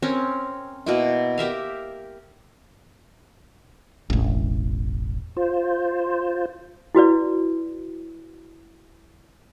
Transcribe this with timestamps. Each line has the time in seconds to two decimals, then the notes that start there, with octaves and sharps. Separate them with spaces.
0.02 C4 C#4 A#4
0.86 B2 A#3 E4
1.38 G4 A#4 E5 F5
4.10 E1 A1
5.37 F4 C5
6.95 E4 F#4 B4 D5